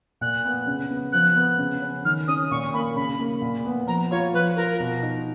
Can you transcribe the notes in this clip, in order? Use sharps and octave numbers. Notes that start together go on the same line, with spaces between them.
A#2 F#6
B3
C#3
B3
F3 F#6
B3
C#3
C#4
D#3 F6
C#4 D#6
A#2 C#6
A#3 B5
C#3 B5
A#3
A#2
B3
F3 A#5
F4 C#5
F3 B4
F4 A#4
B2
D#4